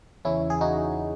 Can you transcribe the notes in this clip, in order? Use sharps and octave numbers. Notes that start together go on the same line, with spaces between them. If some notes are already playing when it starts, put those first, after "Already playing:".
E2 C#3 E3 C#4 E4
G#4
D#4 F#4